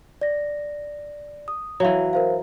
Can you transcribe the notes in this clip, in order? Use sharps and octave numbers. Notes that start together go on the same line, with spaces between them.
D5 A#6
D#6
E3 F#3 C#5 F5
A#4 C5 F5